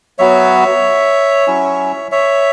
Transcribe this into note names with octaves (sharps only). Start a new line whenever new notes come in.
F#3 B3 F#4 C#5 E5
F#3 C#4 E4
C#5 E5